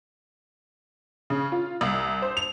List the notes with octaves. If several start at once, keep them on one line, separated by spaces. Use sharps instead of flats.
C#3
F4
C2
C5
F7